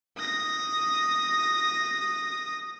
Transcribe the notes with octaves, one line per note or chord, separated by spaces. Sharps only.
D#6 A#6